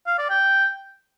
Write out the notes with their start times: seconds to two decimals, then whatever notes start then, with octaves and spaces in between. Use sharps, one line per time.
0.07 F5
0.18 D5
0.30 G5